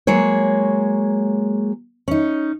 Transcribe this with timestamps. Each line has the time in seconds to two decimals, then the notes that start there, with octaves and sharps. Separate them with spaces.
0.07 F#3 G#3 A#3 C#5
2.08 C#4 D#4